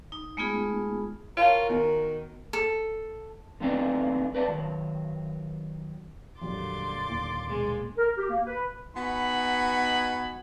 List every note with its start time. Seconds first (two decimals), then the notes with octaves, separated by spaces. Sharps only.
0.12 D#4
0.37 G#3 A3 B3 D#4 F4 G#4
1.37 F4 F#4 A#4 C#5 F5 A5
1.70 D#3 B3
2.53 A4
3.60 D3 F3 B3 C4 D4 D#4
4.35 B4 D5 G5 A5
4.48 D#3 F#3
6.42 F2 A#2 D3 F#3 G3 C6 D6 A6
7.09 D#1 D#2
7.46 B2 G#3
7.97 A#4
8.17 G4
8.30 A#3
8.47 B4
8.95 B3 D#4 F#4 G#5 B5